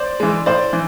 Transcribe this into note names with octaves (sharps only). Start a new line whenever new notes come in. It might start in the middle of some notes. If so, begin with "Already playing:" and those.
Already playing: C5 D5
E3 G#3
A2 C5 D5
E3